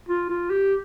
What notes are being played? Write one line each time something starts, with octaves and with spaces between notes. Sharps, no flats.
F4
F4
G4